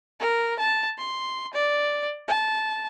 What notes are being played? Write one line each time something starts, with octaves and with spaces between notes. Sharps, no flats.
A#4
A5
C6
D5
A5